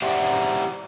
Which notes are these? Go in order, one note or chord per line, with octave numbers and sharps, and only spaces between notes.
G4 C5 D5 E5 F#5